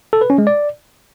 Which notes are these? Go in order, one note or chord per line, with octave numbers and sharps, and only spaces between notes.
A4
B4
C#4
G#3
D5